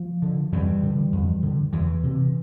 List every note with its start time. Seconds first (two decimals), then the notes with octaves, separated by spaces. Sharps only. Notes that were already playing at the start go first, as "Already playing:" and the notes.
Already playing: F3
0.22 D3
0.52 F2 E3 G3
0.83 D3
1.13 F2
1.43 D3
1.73 E2 E3
2.03 C3